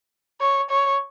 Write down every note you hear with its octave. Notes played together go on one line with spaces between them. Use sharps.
C#5
C#5